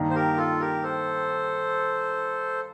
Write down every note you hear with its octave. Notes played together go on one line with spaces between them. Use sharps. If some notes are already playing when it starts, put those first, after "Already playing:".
Already playing: G2 D#3 A#3 D#4
C5
G4 A#4
F4 A4
G4 A#4
A4 C5